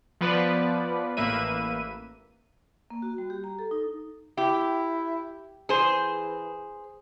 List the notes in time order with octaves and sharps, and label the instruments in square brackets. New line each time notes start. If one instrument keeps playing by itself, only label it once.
[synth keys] F3 B3 B4 D5
A1 A#3 B4 E5 D#7
[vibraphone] A#3
F#4
G3
G4
A#5
A4
D#4
[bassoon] E4 [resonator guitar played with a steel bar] G4
[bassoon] E3 [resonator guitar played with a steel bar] G#4 C5